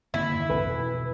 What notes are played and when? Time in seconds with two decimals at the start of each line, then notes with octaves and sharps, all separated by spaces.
0.14 G2 D3 A#3 E4
0.36 F2 D#3
0.50 C2 B2 D3 E3 B4
0.65 F2 B2